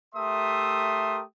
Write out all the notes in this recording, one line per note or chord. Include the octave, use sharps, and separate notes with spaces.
A3 G4 A#4 E5 C6 D#6